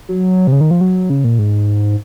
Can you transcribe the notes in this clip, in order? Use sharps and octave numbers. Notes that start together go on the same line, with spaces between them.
F#3
C3
C#3
D#3
F3
F#3
C#3
A#2
G#2